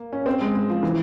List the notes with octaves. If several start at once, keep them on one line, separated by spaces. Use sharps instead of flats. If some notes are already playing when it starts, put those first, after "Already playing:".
Already playing: A#3
C#4
C4
G#3
G#3
F3
E3